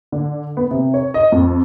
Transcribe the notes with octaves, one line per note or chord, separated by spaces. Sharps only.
D3
B3
C3
C#5
D#5
F2